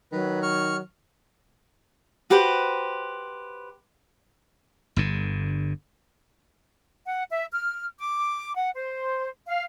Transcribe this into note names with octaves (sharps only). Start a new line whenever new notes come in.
D#3 F#3 B4
C#6 F6
F#4 G4 B4 C5
G1 G2 D3
F#5
E5
F6
D6
F#5
C5
F5